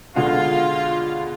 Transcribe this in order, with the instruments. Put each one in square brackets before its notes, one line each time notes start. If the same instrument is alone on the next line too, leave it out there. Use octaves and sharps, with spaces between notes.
[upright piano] B2 D3 G#3 [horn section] F4